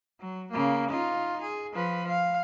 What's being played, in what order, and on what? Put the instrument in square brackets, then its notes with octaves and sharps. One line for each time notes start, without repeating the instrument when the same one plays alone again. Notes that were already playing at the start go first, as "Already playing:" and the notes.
[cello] F#3
C#3 A#3
D#4 F4
G#4
F3 B4
F5